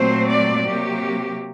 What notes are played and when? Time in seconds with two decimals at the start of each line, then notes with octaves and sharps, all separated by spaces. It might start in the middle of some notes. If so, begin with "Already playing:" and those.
Already playing: A#2 F#3 A3 C4 C5
0.28 D5
0.66 C3 F#3 A#3 G4